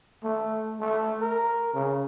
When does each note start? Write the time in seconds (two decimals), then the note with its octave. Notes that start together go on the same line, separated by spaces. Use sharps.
0.24 A3
0.80 A3
1.21 A#4
1.74 C#3